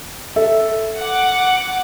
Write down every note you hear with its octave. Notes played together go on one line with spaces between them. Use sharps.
A4 E5
F#5 D6